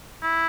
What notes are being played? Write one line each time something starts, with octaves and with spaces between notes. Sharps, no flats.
E4